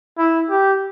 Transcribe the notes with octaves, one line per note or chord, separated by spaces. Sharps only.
E4
G4